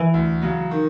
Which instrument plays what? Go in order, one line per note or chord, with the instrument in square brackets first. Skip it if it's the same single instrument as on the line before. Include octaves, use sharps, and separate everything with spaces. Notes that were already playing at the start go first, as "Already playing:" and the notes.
Already playing: [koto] E3
[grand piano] D2
C#3 F#3
D#3